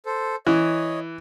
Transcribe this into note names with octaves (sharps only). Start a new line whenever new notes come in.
A4 C5
E3 C#5 D#5